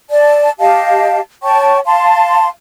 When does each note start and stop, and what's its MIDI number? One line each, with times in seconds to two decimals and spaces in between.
0.10 0.50 74
0.10 0.50 81
0.59 1.19 67
0.59 1.19 75
0.59 1.19 77
0.59 1.19 81
1.43 1.79 73
1.43 1.79 79
1.43 1.79 81
1.43 1.79 85
1.85 2.48 77
1.85 2.48 81
1.85 2.48 84